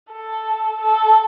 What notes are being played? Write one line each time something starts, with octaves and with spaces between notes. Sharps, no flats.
A4
A4